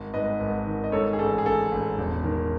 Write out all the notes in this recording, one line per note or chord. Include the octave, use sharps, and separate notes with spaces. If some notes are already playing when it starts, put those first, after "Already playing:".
Already playing: G#1
G#2 B4 D#5
G#1
D#3
D#5
G#2 A4 C#5
G#4
A1 A4
G#4
A1 A4
A1
E1
D#3